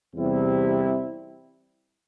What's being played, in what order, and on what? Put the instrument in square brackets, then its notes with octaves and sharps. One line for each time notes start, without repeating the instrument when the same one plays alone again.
[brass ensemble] E2 C3 G3 C4 E4